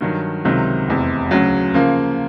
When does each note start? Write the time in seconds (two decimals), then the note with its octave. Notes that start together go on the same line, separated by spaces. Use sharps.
0.01 G2 D#3 F#3
0.45 C#2 C3 D#3 F#3
0.88 F1 E2 C3
1.31 D2 C#3 F#3
1.74 C#3 F3 A#3